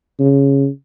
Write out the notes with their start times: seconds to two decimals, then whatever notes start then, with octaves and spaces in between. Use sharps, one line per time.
0.19 C#3